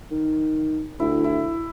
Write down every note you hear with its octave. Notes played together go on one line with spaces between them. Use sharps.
D#3
D2 E4
E4